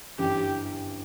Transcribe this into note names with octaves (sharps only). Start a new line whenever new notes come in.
G1 F#2 E3 G4